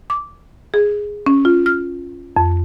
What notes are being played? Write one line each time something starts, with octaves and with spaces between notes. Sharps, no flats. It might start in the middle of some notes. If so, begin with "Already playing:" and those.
D6
G#4
C#4
F4
F6
F2